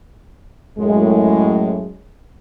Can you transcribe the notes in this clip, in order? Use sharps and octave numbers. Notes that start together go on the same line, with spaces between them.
F#2 A2 G#3